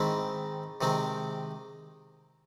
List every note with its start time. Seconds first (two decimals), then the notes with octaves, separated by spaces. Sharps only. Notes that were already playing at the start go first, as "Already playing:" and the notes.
Already playing: G#2 D#3 G#3 C4 E4
0.81 C3 D#3 G#3 C4